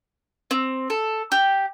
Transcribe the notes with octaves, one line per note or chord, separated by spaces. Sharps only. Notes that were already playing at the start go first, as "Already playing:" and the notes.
C4
A4
G4